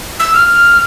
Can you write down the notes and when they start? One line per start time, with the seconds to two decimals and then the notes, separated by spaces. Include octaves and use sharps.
0.20 E6
0.34 F6